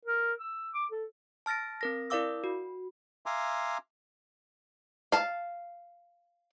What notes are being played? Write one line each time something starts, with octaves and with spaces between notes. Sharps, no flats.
A#4
E6
D6
A4
A5 F6 A6 A#6 D7
C4 A#4 A#6
E4 A#4 D5 F5 D6 E6
F#4
E5 F5 G#5 A#5 C6 D6
F5 A5